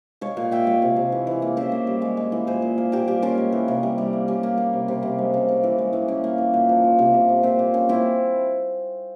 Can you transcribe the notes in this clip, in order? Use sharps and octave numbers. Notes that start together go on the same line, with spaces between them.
G#3 C#5 F5
A#2 C#5 F5
A#2 E5 G5
G#3 C#5 F5
C3
C3
E3
E3
A#3
C#3 C5 E5
A#3
G3
G#3
G#3
E3
A#2 G#4 C5
A#2
A#3
A#2 G4 A#4
G3 G4 A#4
A#3 C#4 F4
G#3
E3
C3
G3
G3
A#3
G3 C#4
A#3
A#3
C3
C3
C3
G#3
C#3
C#3
E3
G#3
E3
A#3 C#4
A#3
E3
A#2
F3
F3
C3
C3
C3
A#2 C4
A#3
A#3 C#4
A#3 C4 E4